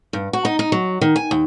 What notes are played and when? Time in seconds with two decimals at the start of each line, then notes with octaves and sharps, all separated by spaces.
0.13 G2
0.33 F#4
0.45 D#4
0.59 D#4
0.72 F#3
1.01 D#3
1.16 G#5
1.31 D#2